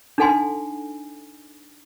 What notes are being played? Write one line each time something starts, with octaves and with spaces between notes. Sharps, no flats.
D4 D#4 A4 F#5 G#5 C6